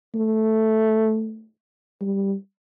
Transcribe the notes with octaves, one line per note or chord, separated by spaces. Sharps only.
A3
G3